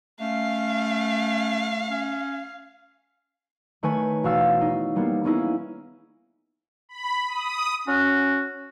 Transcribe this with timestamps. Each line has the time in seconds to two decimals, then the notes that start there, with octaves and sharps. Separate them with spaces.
0.20 A3 C#4 F5
1.90 C#4
3.83 D#3 A3 B4 C#5 G#5
4.24 E1 F#4 F5 E6 A6
4.61 D#4
4.96 G3 A#3 B3
5.24 A#3 B3 C#4 D#4 E4 G#4
6.89 B5
7.28 D#6
7.88 C#4 F#4